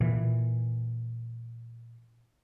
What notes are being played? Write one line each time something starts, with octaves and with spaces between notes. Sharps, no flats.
A#2 E3